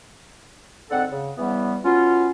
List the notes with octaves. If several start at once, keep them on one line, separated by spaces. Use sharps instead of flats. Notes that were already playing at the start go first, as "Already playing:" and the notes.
G#2 D3 C4 A4 F#5
C#3
C#3 E3 G3 B3
F#3 B3 C#4 F4